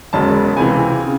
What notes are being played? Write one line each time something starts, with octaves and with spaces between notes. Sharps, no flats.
E1 E2 C#3 G#3 A5
C#2 C3 E3 G#5
C#3